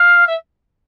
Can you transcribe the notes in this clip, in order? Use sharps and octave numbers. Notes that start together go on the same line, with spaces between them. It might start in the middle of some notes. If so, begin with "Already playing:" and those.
Already playing: F5
E5